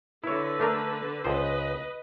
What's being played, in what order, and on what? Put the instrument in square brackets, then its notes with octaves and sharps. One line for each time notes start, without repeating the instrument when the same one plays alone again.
[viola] D3 B4 [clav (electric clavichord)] E4 C#5
[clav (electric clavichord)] A3 D4 A#4
[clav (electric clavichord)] C#2 C5 [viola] B4 D#5